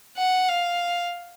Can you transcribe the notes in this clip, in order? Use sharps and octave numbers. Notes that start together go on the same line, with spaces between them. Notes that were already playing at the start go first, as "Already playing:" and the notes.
F#5
F5